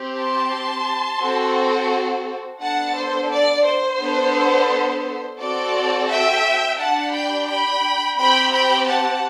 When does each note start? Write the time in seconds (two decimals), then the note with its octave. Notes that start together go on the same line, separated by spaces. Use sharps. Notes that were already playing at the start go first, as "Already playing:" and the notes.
Already playing: C4 G4
0.16 A5 C6
1.21 C4 F#4 A4
2.61 B3 D4 A4 F#5 A5
2.95 C5
3.30 D5
3.65 C5
3.99 B3 D4 A4
5.39 C4 F#4 A4 D5
6.09 E5 G5
6.78 D4 G4 F#5 A5
7.13 G5 B5
7.48 G5 B5
8.18 C4 G4 G5 B5
8.53 G5 B5
8.87 F#5 A5